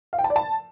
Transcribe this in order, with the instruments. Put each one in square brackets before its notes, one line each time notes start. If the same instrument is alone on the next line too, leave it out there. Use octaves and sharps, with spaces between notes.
[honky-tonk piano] F5
G5
A5
D5
A5